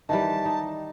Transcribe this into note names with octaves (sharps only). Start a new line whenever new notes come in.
D#3 E3 G3 A5
D#4